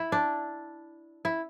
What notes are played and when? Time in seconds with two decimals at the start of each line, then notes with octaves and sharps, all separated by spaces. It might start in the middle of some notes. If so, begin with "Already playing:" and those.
Already playing: E4
0.12 D4
1.25 E4